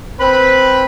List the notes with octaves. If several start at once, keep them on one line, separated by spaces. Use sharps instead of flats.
C4 B4 B5